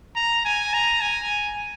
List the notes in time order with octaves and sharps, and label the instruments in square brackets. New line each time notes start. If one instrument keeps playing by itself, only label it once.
[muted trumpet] A#5
G#5
A#5
G#5